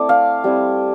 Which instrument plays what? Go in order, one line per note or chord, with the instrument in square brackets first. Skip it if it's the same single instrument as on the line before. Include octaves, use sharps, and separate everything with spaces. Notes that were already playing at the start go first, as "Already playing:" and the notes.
Already playing: [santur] A3 C4 E4 D5
F5
G3 C4 E4